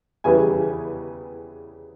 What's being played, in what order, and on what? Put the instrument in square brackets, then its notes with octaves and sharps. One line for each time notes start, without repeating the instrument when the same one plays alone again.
[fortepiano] E2 C#3 E3 G3 B3 G#5